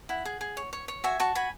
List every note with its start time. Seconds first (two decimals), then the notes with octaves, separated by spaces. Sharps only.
0.09 E4 F#5
0.25 G#4
0.41 G#4
0.57 C#5
0.73 C#5
0.88 C#5
1.04 F#4 E5 G#5
1.20 F#4 A5 C#6
1.35 F#4 G#5 B5